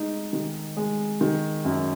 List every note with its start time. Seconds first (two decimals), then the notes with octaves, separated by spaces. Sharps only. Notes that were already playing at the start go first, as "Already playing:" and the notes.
Already playing: G#3 D#4
0.33 D#3
0.77 G#3
1.21 D#3
1.65 F#2